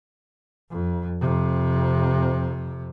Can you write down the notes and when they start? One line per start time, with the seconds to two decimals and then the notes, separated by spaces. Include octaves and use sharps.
0.70 F2
1.21 F2 C3